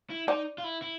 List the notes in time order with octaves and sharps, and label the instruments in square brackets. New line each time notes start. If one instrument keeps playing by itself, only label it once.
[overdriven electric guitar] E4
[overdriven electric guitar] D#4 [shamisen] C5 D5
[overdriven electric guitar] F4
E4
E4